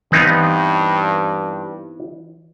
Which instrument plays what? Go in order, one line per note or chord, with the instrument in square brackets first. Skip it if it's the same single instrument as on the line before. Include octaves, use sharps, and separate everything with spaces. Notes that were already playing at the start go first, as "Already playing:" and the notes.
[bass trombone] G2 [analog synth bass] E3 [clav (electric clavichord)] B3 C4 D#4